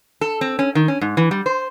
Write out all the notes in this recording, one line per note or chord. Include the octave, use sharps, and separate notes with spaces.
A4
C4
C#4
D#3
C#4
G#2
E3
G3
C5